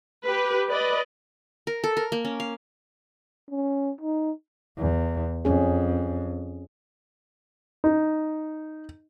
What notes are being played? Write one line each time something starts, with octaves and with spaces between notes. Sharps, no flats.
G4 B4
B4 D5 D#5
A#4
A4
A#4
A#3
C#4
F5
C#4
D#4
E2
F2 C#4 G#4
D#4